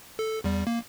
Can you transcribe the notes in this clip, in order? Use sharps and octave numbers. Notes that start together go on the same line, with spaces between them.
A4
E2 G3
A#3